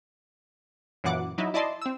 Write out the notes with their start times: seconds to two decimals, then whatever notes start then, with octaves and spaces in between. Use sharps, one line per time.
1.04 F#2 A#2 E3 F#5 D6
1.38 F#3 D#4 E4
1.54 E4 D5 D#5 A5 C6
1.82 C4 E6